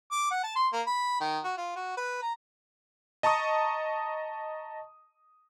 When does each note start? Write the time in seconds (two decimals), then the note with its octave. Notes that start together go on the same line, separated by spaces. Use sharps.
0.12 D6
0.31 F#5
0.43 A5
0.56 C6
0.73 A#3
0.87 B5
1.20 D#3
1.44 F#4
1.57 F4
1.75 F#4
1.97 B4
2.22 A#5
3.23 D#5 A5 A#5 C#6 D#6